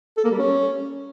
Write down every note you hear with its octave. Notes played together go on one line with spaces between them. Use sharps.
A4
A#3
G3
C#4